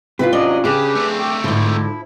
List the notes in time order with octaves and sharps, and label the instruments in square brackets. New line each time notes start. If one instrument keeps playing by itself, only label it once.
[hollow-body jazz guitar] C3 E4 F4 [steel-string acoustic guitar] B4
[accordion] G#2 F#3 D#5 [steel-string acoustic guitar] C#4 D4 D5
[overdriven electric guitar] C#3 [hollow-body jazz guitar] D4 [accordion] G4 B4 [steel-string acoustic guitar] G#4
[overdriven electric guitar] A3 C4
[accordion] G5 D6
[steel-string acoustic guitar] G#2 D3 [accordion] F3 E4